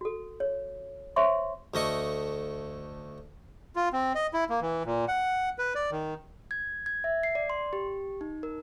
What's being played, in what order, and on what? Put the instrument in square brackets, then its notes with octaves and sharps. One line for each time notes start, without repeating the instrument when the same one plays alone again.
[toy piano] F#4 A4
C#5
C5 C#5 E5 C6 C#6
[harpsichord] D2 A3 D#5 C#6
[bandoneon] F4
C4
D#5
E4
A#3
E3
A#2
F#5
B4
D5
D#3
[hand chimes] G#6
G#6
E5
C7
D5
C6
G4
D#4
A#4